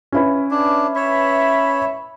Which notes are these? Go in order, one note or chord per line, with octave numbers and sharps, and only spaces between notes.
C#4 E4 B4
D4
C#5 E5 B5